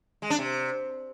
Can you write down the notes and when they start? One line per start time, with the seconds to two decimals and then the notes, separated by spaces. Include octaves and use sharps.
0.22 G#3
0.30 D4
0.38 C3